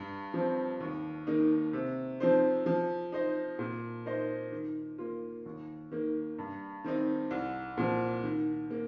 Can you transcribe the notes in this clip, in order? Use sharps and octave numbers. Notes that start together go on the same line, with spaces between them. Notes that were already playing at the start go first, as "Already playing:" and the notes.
Already playing: G2
F3 C4
D#2
D#3 A#3 D#4
C3
F3 C4 D#4 C5
F3
D#4 C5 D#5
A#2
A#3 D#4 C5 D#5
D#3
A#3 F4
D#2
D#3 A#3
G2
D#3 C4 D#4
C2
A#2 F3
D#3
A#3